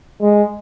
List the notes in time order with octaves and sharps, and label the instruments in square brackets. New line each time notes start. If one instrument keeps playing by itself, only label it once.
[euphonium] G#3